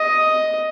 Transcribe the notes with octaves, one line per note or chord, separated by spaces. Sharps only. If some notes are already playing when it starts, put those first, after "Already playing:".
Already playing: D#5